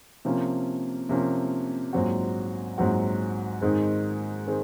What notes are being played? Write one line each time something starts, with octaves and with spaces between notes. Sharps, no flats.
C3 F3 A#3 C#4
C3 F3 A#3 C#4
A#1 G#2 F#3 C4 F#4
A#1 G#2 F#3 C4 F#4
G#2 D#3 G#3 C4 D#4
D#3 G#3 C4